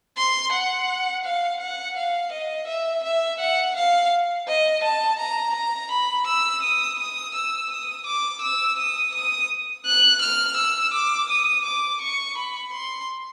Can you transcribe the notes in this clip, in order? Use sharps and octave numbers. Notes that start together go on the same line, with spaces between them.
C6
F#5
F5
F#5
F5
D#5
E5
E5
F#5
F5
D#5
A5
A#5
A#5
B5
E6
D#6
D#6
E6
D#6
D6
E6
D#6
D#6
F#6
F6
E6
D6
D#6
D6
C#6
B5
C6